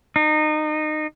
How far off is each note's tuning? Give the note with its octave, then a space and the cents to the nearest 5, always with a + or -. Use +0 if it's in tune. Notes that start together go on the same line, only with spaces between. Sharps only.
D#4 -25